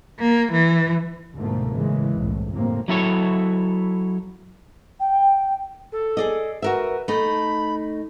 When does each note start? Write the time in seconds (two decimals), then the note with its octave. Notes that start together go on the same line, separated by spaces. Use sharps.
0.19 A#3
0.52 E3
1.34 D2 G#2 B2 F3 A3 A#3
1.72 A1 C#3 E3 G#3
2.14 F#1 C2 A2
2.52 G1 F2 A2 C3 A#3 C4
2.88 F#3 E4 A4 C#5
5.00 G5
5.92 A4
6.17 G#4 D5 D#5
6.62 F#4 A#4 B4 E5
7.08 A3 D#4 B5